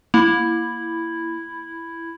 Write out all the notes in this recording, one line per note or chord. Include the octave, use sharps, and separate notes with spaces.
A#3 E4